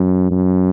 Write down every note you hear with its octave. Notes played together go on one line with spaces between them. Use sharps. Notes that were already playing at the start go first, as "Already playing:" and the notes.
Already playing: F#2
F#2